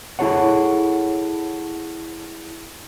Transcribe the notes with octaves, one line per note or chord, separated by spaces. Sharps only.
E4 G#4 A4 C#5 F#5